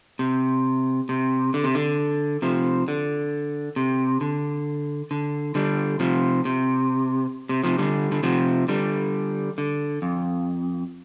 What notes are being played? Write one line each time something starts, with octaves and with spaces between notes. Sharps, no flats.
C3
C3
D3
C3
D3
C3 F3
D3
C3
D3
D3
D3 G3
C3 F3
C3
C3
C3 F3
D3 G3
D3
C3 F3
D3 G3
D3
F2